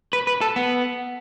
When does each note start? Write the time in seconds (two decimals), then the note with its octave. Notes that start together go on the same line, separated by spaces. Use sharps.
0.13 B4
0.27 B4
0.41 A4
0.56 B3